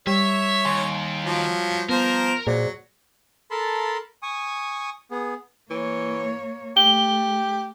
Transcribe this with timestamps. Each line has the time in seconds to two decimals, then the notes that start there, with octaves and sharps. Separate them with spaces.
0.07 G3 C#5 E5
0.65 D#2 G#5 C6
1.24 F3 F#3
1.89 F3 B3 A#4 C5
2.47 A#2 F#3 G#4 C5 D5
3.51 A4 A#4 A5 B5 C6
4.23 G#5 C#6 D#6
5.11 B3 G#4
5.70 E3 A#3 C#5
6.77 A3 G4 G7